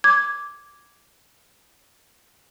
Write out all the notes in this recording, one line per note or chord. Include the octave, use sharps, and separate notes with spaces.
D6 G#6